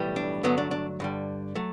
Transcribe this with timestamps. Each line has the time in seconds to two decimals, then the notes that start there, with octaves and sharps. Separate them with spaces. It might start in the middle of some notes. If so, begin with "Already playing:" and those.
Already playing: B1 A2 E3 G3
0.16 D4
0.43 G2 D3 F#3 A3 B3
0.58 D4
0.71 D4
1.00 G2 D3 G3
1.55 F#3 A3